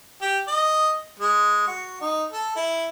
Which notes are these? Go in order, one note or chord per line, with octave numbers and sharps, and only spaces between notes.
G4
D#5
G#3
F#4
D#4
A4
E4